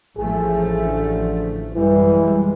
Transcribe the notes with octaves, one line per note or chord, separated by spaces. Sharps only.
A1 F3 A3 G#4
D3
F#2 E3 G3 G#3